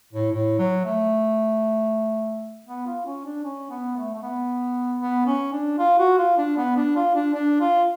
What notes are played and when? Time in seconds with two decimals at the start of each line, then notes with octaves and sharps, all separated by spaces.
0.13 A2
0.32 A2
0.58 F#3
0.85 A3
2.67 B3
2.86 F4
3.05 C#4
3.25 D4
3.44 C#4
3.70 B3
3.97 A3
4.15 A3
4.23 B3
5.01 B3
5.26 C#4
5.53 D4
5.78 F4
5.99 F#4
6.18 F4
6.38 D4
6.57 B3
6.76 D4
6.96 F4
7.15 D4
7.34 D4
7.60 F4